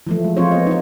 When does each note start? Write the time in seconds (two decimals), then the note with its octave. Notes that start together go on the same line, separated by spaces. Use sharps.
0.07 E3 F3 A3
0.24 G#3
0.37 F3 C4 F4 C5 C#5
0.52 B3 D#5
0.67 D#4 C#5